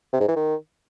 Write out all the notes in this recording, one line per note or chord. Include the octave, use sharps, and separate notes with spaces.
C3
G#2
E3
D#3